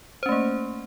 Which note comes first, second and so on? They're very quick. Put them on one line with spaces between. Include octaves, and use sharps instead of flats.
C5 C#4 A3 A#3